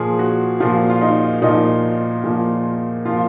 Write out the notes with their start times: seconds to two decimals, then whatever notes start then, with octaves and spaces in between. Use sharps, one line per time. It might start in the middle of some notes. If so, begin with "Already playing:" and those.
Already playing: A#2 F3 G#4
0.19 F#4
0.60 A#2 F3 F4
0.90 F4
1.01 D#4
1.42 A#2 F3 D#4
2.24 A#2 F3
3.05 A#2 F3 F4